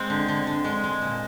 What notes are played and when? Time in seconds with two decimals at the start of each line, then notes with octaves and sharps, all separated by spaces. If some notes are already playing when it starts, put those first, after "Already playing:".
Already playing: G#3 C4
0.10 D3
0.28 D3
0.47 D3
0.65 G#3
0.84 G#3
1.02 A#2